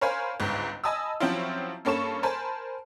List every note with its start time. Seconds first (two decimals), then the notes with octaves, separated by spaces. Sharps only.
0.01 A#4 C5 C#5 F5 G#5 B5
0.40 G1 C#2 G#2
0.84 D#5 G#5 A5 B5 D#6 E6
1.20 F3 F#3 C4 C#4 E4 F4
1.85 G2 A#3 C#4 A4 C#6 E7
2.23 A#4 C5 G#5 A5 B5